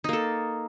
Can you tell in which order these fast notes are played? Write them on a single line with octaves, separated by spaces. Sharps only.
D#4 A#3 A4